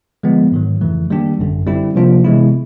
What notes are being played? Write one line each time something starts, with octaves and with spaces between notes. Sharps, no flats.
D3 F3 G#3 B3
G#2 D#3 F#3
F2 C#3 E3 A3
D#3 G3 A#3 D4 G4
G#1 F#2 D3
D3 G3 C4 E4
C3 F3 A#3 D4 F4
C3 E3 G#3 B3 E4